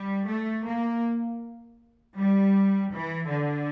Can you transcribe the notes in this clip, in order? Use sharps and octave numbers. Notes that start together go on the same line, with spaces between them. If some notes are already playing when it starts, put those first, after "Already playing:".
Already playing: G3
A3
A#3
G3
E3
D3